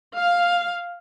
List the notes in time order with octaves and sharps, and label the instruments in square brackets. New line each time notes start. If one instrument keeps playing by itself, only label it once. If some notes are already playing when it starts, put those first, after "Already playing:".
[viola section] F5